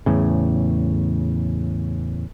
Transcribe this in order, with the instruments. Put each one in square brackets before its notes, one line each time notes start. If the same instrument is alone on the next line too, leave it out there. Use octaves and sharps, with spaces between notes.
[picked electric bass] E2 A2 C#3